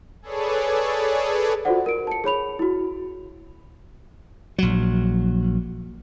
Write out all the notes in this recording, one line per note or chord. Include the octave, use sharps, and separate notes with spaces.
G#4 A4 B4 C#5 D5
F4 F#4 A4 C5 D5 F#5
A#4 D7
A5 C#7
G#4 C#5 B5 F7
E4 F#4
A#1 F#3